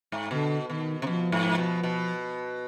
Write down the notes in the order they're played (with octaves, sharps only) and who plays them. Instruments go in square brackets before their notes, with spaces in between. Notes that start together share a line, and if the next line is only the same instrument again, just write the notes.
[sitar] G#2
[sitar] B2 [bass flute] D3
[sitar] B2 [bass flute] D#3
[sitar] C3
[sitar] B2 [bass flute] F3
[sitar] G#2
B2
B2